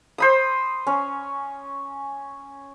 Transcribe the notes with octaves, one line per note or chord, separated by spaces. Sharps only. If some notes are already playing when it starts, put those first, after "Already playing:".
C5 B5 D#6
C#4